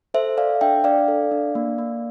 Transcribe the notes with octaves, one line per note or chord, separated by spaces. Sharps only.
A4 C5 E5
A4 D5 F5
D4 E5 G5
D4 D5 F5
A4
D4
A#3
A#3